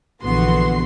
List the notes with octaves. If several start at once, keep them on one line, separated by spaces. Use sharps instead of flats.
A#1 D3 E3 B3 F#4 C6